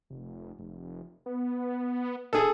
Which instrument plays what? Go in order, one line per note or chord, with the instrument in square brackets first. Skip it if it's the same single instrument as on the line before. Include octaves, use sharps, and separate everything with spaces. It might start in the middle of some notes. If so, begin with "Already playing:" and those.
[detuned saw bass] F1
F1
B3
[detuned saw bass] A#2 [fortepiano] G#4 A4